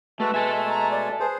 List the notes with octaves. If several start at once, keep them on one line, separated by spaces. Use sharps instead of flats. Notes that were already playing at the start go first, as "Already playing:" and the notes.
G#3 A3 F#4 A4 B4
B2 G#3 A4 E5 G#5
A#5
D5
G#4 B4 C5